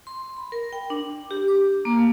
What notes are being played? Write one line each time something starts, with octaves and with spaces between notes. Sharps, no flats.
C6
B5
A#4
G5
D4
G4
D6
A#3
A3